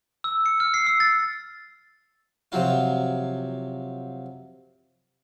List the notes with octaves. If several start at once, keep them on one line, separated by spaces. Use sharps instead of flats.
E6
C#7
F6
C7
E6
A6
C3 F3 F#3 F4